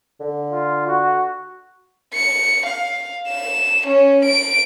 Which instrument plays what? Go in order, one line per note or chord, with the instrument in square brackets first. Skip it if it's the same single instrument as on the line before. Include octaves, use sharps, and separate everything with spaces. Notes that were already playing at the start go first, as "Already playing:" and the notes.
[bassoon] D3
[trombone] F4
F#4
[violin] C#7
F5
E7
C#4
D7